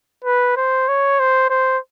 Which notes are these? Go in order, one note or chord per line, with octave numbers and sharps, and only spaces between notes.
B4
C5
C#5
C5
C5